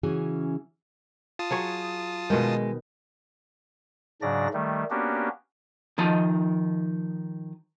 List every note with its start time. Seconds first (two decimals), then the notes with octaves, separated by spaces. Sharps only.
0.03 C#3 E3 C#4 F#4 G#4 G#5
1.39 F4 A5 D#6
1.51 F#3 G#4 C#5
2.30 B2 D#3 G#3 A3
4.22 G#2 C#3 F#3 D4 D5 A#6
4.53 D#3 G3 A3
4.91 A#3 B3 C#4 D4 F#4 G4
5.98 D#3 F3 D#4 D#5 A5